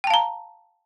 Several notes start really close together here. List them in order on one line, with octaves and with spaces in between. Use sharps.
G5 A5 F5 A#5